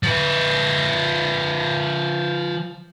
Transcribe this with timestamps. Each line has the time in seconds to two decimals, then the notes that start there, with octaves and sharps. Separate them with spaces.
0.03 F3 B4